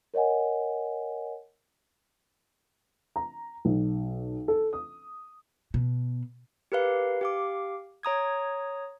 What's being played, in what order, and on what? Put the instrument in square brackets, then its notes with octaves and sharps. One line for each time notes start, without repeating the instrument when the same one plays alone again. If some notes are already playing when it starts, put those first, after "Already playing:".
[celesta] A#4 C#5 D#5 F#5 G#5
[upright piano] A#5
B1
A4
D#6
[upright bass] B2
[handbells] G4 A#4 B4 F5
G4 F5 D6
C#5 A#5 D#6 G#6